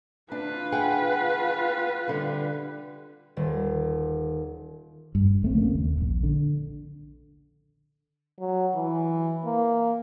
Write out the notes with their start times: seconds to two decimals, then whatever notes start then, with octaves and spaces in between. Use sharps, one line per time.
0.32 D4 F4 B4
0.72 G#4 F#5 G5
2.08 D3 G3
3.37 D#1
5.15 G2
5.42 A#1 A3 C4
5.55 C#3 A#3
5.75 D#2
5.97 E1 A#1
6.23 D3
8.39 F#3
8.75 E3
9.44 A#3